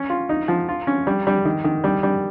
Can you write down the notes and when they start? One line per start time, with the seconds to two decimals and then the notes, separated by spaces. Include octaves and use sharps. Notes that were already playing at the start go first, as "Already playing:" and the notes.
Already playing: C#4
0.10 F4
0.29 D#4
0.48 F3
0.69 F4
0.87 C#4
1.07 G3
1.27 G3
1.45 D#3
1.64 D#3
1.84 G3
2.03 G3